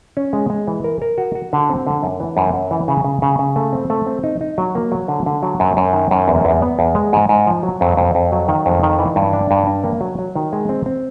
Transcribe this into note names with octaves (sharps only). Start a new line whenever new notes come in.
C#4
G#3
G#3
E3
A#4
A#4
F#4
F#4
D3
C4
D3
F#2
E3
F#2
F#2
E3
C#3
C#3
C#3
C#3
A3
C4
A3
C4
D#4
D#4
F#3
A#3
F#3
D3
D3
F#3
F#2
F#2
D#3
F#2
E2
E2
B3
E2
G#3
G#2
G#2
F3
F#3
F2
F2
F2
F#3
D#3
F2
D#3
E3
G2
D4
G2
D4
A#3
F#3
F#3
D#3
G#3
C4
C4